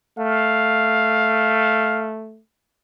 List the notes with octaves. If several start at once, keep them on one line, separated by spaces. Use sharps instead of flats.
A3 F5